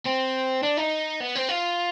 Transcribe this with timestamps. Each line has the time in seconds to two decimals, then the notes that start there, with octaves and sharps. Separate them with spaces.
0.06 C4
0.63 D4
0.77 D#4
1.20 B3
1.35 C4
1.49 F4